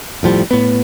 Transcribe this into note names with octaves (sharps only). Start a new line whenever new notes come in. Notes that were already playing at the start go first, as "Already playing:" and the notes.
F1 A2 F3 G3
A2 B3